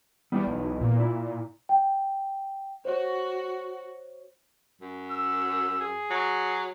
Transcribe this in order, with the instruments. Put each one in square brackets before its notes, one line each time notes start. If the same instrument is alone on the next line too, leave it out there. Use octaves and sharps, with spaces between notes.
[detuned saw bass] G3 [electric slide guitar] B3 E4 B4
[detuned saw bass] B1
A#2
[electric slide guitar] E4
[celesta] G5
[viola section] F#4 [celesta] C5 C#5
[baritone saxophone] F#2
[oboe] E6
G#4
[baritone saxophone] F#3